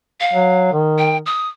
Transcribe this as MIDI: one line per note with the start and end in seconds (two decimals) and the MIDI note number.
0.20 0.70 77
0.33 0.69 54
0.73 1.22 51
0.98 1.18 79
1.26 1.48 87